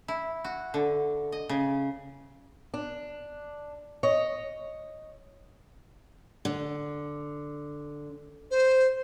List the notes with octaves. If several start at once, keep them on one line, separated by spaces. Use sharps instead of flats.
E4
F#4
D3
D#5
C#3
D4
C#5 D#5
D3
C5